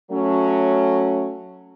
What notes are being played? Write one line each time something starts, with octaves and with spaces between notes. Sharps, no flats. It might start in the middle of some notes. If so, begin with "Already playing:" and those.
F#3 A3 C#4